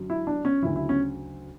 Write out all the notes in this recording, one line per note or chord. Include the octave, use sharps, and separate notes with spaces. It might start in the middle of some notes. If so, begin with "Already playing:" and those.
Already playing: F#2 D3 F#3
E4
D4
C#4
D2 C#3 F#3 E4
E4
C#4